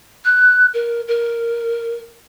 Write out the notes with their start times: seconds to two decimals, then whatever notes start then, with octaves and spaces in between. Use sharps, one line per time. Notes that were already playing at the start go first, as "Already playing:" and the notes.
0.25 F#6
0.74 A#4
1.08 A#4